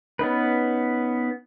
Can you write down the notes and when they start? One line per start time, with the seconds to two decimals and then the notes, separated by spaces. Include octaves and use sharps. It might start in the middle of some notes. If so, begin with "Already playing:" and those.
0.19 B3 C#4 D#4 B4